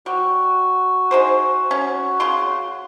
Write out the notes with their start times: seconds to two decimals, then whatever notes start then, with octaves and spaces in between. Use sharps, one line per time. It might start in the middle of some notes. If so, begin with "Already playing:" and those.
0.06 G3 F#4
1.11 D#4 G#4 C5
1.71 C#4
2.20 C#3 C6